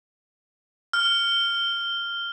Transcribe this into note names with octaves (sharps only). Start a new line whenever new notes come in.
F6